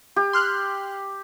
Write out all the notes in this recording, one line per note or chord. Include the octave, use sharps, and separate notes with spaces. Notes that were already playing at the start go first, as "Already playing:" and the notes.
G4
C6 F6 F#6